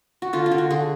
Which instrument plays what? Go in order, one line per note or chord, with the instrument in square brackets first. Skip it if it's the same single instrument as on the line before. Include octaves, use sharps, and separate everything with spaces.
[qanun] F#4
D3 F4
F4
D3
F#4
D3 G#4